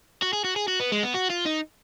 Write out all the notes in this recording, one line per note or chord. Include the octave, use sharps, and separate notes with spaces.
F#4
G#4
F#4
G#4
F#4
B3
G#3
B3
F#4
F4
D#4